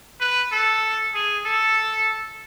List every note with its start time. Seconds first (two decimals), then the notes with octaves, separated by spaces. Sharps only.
0.20 B4
0.52 A4
1.15 G#4
1.46 A4